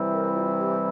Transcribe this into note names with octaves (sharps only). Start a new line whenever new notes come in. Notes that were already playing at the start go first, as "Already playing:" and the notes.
Already playing: C3 E3 G3 C4 E4
A#4
F4
G4